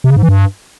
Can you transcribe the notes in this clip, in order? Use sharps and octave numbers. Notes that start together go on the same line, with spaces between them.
C3
C#3
G#2
E3
G2